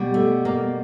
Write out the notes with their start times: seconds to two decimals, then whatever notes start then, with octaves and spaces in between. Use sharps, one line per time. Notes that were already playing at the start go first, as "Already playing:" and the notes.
Already playing: B2 G3
0.14 A3
0.45 A#3